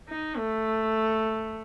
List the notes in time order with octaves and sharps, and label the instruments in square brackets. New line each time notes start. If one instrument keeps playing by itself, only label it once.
[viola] D#4
A3